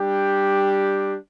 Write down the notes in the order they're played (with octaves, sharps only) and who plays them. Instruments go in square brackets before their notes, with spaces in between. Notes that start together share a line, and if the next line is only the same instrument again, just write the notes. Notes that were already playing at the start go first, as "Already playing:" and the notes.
Already playing: [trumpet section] G3 D4 G4